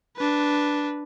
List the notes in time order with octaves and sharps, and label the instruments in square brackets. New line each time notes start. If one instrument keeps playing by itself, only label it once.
[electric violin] D4 B4